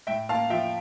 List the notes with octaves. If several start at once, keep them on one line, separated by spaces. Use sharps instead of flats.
A2 E5 G5
A#3 F5 A5
F3 E5 G5